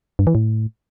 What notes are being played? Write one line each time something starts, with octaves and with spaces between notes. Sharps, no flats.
G2
E3
A2